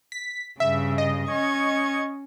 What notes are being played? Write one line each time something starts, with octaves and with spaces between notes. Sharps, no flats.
B6
G2 C#3 E5
D#5
C#4 C#6 G#6